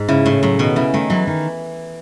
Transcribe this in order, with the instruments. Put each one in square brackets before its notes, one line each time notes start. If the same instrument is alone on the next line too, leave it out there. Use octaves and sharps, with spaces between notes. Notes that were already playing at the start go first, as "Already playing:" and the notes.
Already playing: [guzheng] G#2
[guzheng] C#3 [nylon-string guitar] E4
[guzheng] A2 [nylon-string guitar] A3
[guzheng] A2 [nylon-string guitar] F#3
[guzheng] B2 [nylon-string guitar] D#3
[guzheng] C#3 [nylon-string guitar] E4
[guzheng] D#3 [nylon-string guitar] A3
[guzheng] E3 [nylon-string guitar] F#3
[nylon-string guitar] D#3